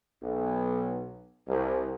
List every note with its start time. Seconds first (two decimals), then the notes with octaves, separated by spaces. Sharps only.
0.21 B1
1.47 C2